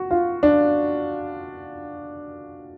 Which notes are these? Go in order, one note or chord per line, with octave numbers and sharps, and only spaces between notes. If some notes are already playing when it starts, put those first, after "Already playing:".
Already playing: F#4
F4
D4